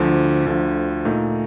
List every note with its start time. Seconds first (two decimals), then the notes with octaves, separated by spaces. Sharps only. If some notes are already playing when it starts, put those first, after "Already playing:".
Already playing: D2 D3 F3
0.46 D2 D3 F3
1.05 A#2 A3 D#4